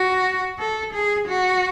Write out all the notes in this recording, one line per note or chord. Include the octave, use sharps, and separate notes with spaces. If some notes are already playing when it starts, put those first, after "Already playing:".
Already playing: F#4
A4
G#4
F#4